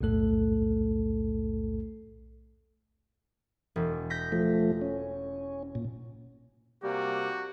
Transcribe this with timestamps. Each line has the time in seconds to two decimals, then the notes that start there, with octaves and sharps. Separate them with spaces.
0.01 B1 E2 A2 A3 A4
3.76 E1
4.10 G6 A#6 B6
4.32 F3 A3
4.81 C#4
5.75 A#2
6.83 C3 G3 A#3 F#4 G4